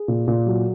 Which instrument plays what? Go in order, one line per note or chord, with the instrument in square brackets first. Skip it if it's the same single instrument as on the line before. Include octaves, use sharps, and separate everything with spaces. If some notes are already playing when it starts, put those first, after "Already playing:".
Already playing: [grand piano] G#4
A#2
A#2
F#3